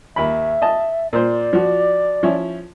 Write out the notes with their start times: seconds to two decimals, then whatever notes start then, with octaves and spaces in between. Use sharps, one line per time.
0.16 D#2 E5 B5
0.62 D#5 A5
1.13 A#2 C5 D5
1.53 F3 F#4
2.23 F3 C#4 E4